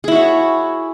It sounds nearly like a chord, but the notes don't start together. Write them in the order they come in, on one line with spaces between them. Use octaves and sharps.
G#4 E4 F#4 C#5